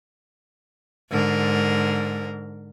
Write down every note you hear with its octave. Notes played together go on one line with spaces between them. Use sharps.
G#2 D3 A#4